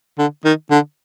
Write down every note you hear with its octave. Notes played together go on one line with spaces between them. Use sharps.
D3
D#3
D3